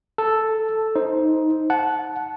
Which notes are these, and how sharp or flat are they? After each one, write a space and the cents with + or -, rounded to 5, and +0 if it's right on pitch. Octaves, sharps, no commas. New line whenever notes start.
A4 +0 A5 +0
D#4 +15 C5 +0
F#5 +0 A5 -20